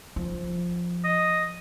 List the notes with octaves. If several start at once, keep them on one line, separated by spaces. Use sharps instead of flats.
F3
D#5